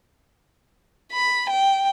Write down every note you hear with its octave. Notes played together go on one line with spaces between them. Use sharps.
B5
G5